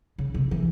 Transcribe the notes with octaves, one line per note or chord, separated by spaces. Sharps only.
C#3
C3
E3